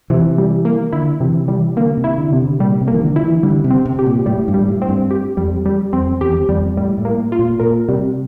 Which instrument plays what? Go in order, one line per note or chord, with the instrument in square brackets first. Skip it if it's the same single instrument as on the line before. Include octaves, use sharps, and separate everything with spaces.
[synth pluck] C3 [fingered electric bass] E3
[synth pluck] G3
A#3
[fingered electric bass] D3 [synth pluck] E4
[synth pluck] C3 [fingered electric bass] E3
[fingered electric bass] E3 [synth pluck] G3
[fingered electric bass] D3 [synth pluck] A#3
[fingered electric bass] C3
[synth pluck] E4
[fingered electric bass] D3
[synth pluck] C3
[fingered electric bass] D3
[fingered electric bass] A#2 [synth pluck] G3
[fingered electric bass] C3
[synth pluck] A#3
[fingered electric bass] E3
D3
[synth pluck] E4
[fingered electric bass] E3
[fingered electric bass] D3 [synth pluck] G3
[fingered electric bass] C3
[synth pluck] C4
[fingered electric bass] C3
[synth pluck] G4
[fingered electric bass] A#2
[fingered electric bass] A2 [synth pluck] G3
[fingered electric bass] G2
[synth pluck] G3
[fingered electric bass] A2
[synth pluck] C4
[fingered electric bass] G2
[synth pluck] G4
[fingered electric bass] F2 [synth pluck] G3
[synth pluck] G3
[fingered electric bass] F2 [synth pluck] C4
[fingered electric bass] E2 [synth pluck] G4
[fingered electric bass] E2
[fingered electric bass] F2 [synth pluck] G3
[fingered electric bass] A2 [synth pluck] G3
[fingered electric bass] A2
[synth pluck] A#3
F4
[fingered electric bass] A#2
[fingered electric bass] A#2 [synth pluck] A#4
[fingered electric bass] C3 [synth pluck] G3